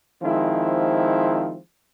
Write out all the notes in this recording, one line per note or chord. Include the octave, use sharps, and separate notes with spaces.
D#3 F3 G#3 C4 E4